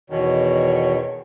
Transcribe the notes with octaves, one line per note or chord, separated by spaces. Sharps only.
E2 B2 D#3 C#5